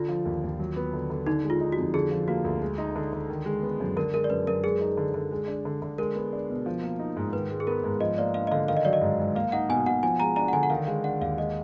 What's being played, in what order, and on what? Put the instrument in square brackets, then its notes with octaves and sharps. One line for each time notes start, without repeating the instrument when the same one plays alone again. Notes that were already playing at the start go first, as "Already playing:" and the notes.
Already playing: [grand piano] D3 [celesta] F4
[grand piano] F3
D#2
D#2
F#3
B3
D3
D3
[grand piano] D3 [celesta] D#4
[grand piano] G#3
[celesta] F4
[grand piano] D#4
[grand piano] F2 [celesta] F#4
[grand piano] D3 [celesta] G#4
[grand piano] F3
[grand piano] A#3 [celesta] F#4
[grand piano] D2
G#3
D#4
D3
D3
D#3
G#3
B3
F#2
[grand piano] D3 [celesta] A#4
[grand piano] G#3 [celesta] A#4
[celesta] D5
[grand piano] F#2 [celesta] B4
[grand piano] F#2 [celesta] A#4
[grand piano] G#3 [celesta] G#4
[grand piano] D#4
D3
D3
G#3
D4
D3
D3
[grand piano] G#3 [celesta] A#4
[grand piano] B3
D4
B2
F3
A#3
D#4
G#2
[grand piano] D#3 [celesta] B4
[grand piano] G#3
[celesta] G#4
[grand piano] B3 [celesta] A#4
[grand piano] G#2
[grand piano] F3 [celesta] D#5
[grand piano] A#3 [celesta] D5
[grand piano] D4 [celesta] F5
[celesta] D#5
[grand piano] D3 [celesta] F5
[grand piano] D#3 [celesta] F5
[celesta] D#5
[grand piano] F#3 [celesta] D5
[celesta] D#5
[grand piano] G#2
G#2
[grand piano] A#3 [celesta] F5
[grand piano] D#4 [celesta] F#5
[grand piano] B2 [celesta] G#5
[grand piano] B2 [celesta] F#5
[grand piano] F3 [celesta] G#5
[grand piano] G#3 [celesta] A#5
[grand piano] D4 [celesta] A#5
[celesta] F#5
[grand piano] D3 [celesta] G#5
[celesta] F#5
[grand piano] D#3 [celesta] F5
[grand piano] G#3 [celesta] F5
[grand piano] D4 [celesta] F#5
[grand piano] D#2 [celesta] F5
[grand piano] G#3 [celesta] D#5